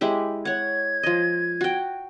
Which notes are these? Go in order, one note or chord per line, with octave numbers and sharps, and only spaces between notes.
G#3 E4 G4
C#5 F#5 G#6
F3 D#5
F#4 G5